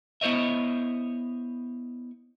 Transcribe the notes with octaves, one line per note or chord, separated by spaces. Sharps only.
B3 E4 C5 C#5 D#5 E5